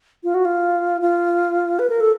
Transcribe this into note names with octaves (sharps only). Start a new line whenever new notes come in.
F4
F#4
F4
F4
B4
A#4
A4